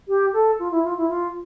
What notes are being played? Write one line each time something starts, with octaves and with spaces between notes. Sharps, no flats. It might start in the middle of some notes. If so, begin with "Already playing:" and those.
G4
A4
F4
E4
F4
E4
F4